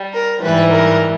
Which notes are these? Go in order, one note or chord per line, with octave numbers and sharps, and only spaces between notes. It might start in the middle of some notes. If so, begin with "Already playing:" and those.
Already playing: G3
A#4
G#2 E3 G3 B4
A#4